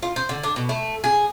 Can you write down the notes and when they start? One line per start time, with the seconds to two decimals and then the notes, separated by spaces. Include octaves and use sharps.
0.02 F4
0.16 C5
0.29 D3
0.43 D4
0.56 B2
0.69 A3
1.04 G#4